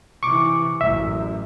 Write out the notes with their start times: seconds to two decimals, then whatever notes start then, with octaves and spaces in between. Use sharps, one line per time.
0.23 C3 E3 C#6 D6
0.81 A1 F#2 E5